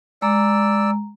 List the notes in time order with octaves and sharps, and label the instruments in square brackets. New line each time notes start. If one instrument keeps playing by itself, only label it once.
[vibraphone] G#3 A#5 [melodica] D5 E6